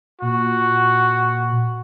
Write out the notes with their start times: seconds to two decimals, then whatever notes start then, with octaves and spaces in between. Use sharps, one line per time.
0.22 A#2 F#4